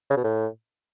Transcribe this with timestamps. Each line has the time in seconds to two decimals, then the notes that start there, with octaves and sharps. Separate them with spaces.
0.10 C#3
0.17 B2
0.24 A2